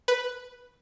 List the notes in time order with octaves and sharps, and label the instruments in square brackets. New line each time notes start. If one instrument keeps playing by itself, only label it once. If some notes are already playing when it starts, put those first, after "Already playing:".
[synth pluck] B4